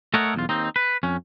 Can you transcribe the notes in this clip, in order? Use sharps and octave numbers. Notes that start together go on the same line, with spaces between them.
A3 A4 A#4 C#5 D#5 F#5
B1 E2 F4
D#2 C4 D#4
B4
F2 C#4